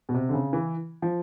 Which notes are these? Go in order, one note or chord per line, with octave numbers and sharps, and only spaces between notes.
B2
C3
D3
C#3
E3
F3